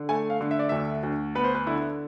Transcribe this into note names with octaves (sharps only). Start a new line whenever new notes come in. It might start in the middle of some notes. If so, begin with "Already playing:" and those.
Already playing: D3
A3 G#5
F5
D3
E5
D5
D2 E5
D2
B3 B4
C5
B4
D3 E4